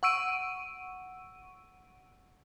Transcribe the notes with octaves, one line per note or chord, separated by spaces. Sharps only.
F#5 C#6 E6 D7 D#7